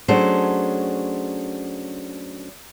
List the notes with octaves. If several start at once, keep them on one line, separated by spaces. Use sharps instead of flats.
F#3 A3 C#4 D4 G#4 C5